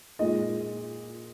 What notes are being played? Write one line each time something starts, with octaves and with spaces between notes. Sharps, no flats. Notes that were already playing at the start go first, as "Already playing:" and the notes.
A#2 G#3 D#4 D#5